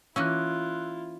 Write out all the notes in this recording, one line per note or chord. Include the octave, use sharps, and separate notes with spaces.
E3 A#3 C#4 E4 F4 E6 F#6